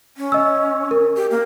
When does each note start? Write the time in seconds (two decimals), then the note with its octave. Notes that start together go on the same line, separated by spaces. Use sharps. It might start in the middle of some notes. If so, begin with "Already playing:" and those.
0.17 C#4
0.32 D#5 E6
0.91 A#4
1.16 G4
1.31 A#3